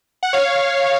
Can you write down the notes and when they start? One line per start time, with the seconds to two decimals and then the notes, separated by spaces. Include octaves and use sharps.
0.23 F#5
0.33 C#5 F5